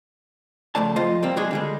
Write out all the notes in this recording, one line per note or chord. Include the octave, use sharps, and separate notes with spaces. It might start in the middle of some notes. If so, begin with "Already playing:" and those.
C#2 F3 A3 D5 A5
F2 F3 F4 C5 D#5
G3 A#3 C4
B2 F#3 G#3 D4 G#4
D3 G3 G#3